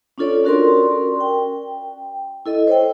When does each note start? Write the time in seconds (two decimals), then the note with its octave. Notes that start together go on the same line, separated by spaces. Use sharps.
0.18 C#4 D4 F4 A4 C#5 D5
0.44 C#4 F#4 A#4 D5 C6
1.21 G5
2.46 E4 A4 D#5
2.67 C5 C#5 G5